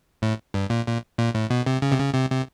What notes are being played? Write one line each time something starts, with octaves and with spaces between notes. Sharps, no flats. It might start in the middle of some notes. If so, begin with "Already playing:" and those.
A2
G2
A#2
A#2
A#2
A2
B2
C3
C#3
C3
C#3
C3
C3